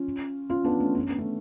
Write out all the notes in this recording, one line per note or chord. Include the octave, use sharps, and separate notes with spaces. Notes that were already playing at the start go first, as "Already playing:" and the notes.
Already playing: C#4 F4
C#4 F4
B3 D4
A3 C#4
D4
C#4
B3
A3 C#4